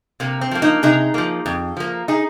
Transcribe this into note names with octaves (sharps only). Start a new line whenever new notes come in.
C3 A#3
C4
F3 A#3
A#3 D#4
C3 D#4 G#4
F3 A#3
F2
F3 A#3
D#4 G#4